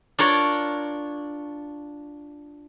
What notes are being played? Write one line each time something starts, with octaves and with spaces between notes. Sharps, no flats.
D4 F4 A#4 C#5